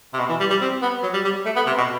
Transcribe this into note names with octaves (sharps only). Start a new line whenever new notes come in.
C3
B2
E3
G3
G3
C4
B3
F#3
G3
G3
A3
B3
C3
B2